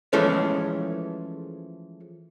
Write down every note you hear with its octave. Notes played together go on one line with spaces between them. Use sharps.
E3 F3 G#3 A3 C#4